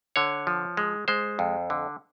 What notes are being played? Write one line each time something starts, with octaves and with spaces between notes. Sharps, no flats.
D3 C#5
F3
G#3
G#3 C5
F2
D3